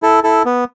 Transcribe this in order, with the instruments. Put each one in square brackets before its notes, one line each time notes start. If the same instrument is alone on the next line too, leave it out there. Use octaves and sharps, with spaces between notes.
[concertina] E4 A4
E4 A4
B3